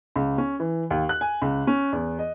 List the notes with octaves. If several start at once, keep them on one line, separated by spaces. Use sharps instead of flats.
C#2
C#4
E3
D#2
F#6
G#5
C#2
C#4
E2
D#5